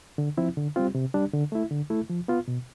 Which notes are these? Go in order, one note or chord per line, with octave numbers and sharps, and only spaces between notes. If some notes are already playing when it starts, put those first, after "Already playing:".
D3
F3 C4 E4
D3
G3 C4 F4
C3
G3 D4
D3
A3 E4
D3
A3 E4
F3
B3 F4
B2